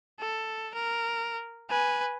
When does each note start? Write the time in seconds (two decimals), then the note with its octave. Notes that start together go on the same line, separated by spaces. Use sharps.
0.19 A4
0.74 A#4
1.70 B4 G#5